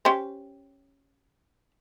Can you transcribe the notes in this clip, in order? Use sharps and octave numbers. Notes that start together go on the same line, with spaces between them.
C#4 G4 C5